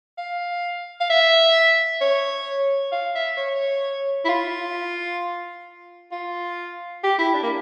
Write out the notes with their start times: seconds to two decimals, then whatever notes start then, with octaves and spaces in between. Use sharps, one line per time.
0.18 F5
1.00 F5
1.10 E5
2.01 C#5
2.92 F5
3.15 E5
3.37 C#5
4.25 E4
4.29 F4
6.12 F4
7.04 G4
7.18 E4
7.34 D4
7.43 A#3